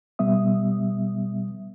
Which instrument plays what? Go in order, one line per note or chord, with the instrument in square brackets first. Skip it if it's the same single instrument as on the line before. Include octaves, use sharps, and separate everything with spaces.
[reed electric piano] B2 G3 B3 E5 D#6